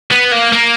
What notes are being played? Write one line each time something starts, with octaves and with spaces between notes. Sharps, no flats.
B3
A#3
A#3